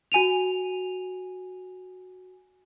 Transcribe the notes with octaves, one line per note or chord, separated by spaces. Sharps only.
F#4 G#5 D#7 F7